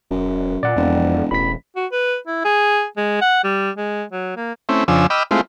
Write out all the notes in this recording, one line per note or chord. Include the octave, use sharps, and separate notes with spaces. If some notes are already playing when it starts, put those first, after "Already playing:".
E1 F#2
A#2 D5 F#5
E1 F2
E1 A1 B5 B6
F#4
B4
E4
G#4
G#3
F#5
G3
G#3
F#3
A#3
A3 C4 C#4 E4
F2 C#3 F3 D4 G#5 E6
D#5 G5 B5 D6 E6 F6
G#3 A3 C4 E4 F4